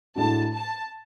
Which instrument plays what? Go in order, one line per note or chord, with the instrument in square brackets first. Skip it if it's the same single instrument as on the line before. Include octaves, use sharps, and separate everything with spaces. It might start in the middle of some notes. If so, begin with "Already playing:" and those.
[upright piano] A2 G#3 D4 F#4 [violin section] A5
[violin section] A5